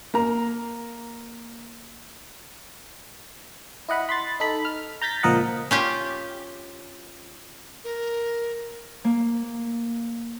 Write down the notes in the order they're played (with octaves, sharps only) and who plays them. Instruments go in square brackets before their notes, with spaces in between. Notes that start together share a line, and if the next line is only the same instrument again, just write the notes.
[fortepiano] A#3 A#5
[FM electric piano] E4 D#5 F#5 B5
B5 C6 A6
D#4 A4 B5
F6
A#5 G6 A6 B6
C#2 A#2 F3 A#4 D#5 F#5
[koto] C#4 F4 G4
[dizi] A#4
[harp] A#3